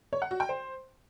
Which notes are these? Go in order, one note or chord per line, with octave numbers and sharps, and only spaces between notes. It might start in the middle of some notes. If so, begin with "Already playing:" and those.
C#5
F#5
F#4
G5
C5